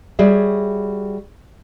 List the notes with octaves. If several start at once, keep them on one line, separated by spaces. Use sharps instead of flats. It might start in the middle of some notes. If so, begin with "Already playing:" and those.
G3 F#4 G#4 C#5 E5